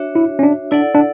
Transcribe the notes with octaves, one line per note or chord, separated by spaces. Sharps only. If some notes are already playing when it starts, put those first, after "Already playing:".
Already playing: D4 F#4 C#5 E5
E4
C#4
D4
D4 E4 A4 D5 F#5
D4